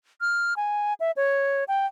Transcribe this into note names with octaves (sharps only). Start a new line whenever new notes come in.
F6
G#5
E5
C#5
G5